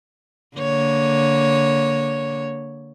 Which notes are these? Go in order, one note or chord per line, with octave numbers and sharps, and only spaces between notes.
D3 A#3 C#5